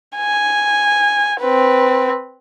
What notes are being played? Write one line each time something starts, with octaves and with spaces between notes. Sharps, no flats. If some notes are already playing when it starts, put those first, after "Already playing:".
G#5
C4 B4